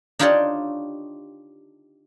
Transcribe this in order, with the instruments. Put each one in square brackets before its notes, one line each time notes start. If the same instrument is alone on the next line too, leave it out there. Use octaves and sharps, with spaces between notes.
[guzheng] D4 D#4 F4 G4 C#5 D5